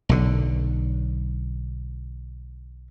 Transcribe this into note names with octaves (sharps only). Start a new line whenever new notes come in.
B1 D3